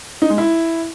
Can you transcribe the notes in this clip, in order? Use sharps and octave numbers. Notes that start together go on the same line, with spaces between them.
D#4
G#3
E4